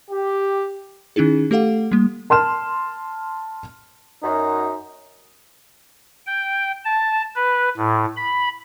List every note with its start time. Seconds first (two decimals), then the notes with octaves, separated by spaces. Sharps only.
0.11 G4
1.16 D#3 C#4 D#4 E4 G#4
1.51 A3 G4 A4 F5 F#5
1.92 G3 A#3
2.30 A5 C6 F6 E7
4.23 F#2 D#4
6.26 G5
6.85 A5
7.35 B4
7.77 A2
8.16 B5